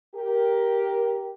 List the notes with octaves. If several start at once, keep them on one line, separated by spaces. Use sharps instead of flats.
G4 A#4